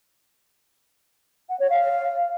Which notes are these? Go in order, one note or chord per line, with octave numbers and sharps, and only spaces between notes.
F#5
C#5
F5